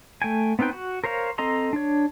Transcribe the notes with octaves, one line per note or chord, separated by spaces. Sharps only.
A3 G5 G#5
B3 C4 D#4 B4 G5
F#4
A#4 C5 C#5 F5
C4 A4 D#5 A#5 C6
D4 C#5